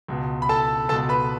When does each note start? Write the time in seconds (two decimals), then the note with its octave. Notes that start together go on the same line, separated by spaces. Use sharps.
0.08 C#2 B2
0.42 B5
0.49 A4 A5
0.89 C#2 A4 A5
0.92 B2
1.09 B4 B5